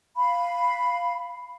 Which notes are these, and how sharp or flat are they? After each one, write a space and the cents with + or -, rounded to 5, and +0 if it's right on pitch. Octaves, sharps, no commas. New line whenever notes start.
F5 +0 B5 +5